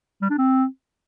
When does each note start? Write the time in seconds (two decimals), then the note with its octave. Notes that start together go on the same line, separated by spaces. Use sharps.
0.22 G3
0.30 D4
0.38 C4